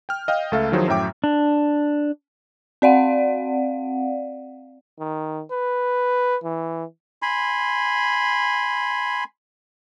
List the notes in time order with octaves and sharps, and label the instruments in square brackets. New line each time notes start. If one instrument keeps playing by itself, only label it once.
[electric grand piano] G5 F6
D#5 F5 G5
C#2 A3 A4 E5 F5
D#3 F3 F#3 E4 G#4 C5
F#2 A2 F#3 E5 G5 D6
[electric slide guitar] D4
[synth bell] C4 D5 F5 F#5
[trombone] D#3
B4
E3
[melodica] G#5 B5 C6